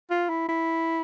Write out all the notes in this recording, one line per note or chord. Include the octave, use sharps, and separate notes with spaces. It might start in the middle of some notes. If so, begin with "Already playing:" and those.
F4
E4
E4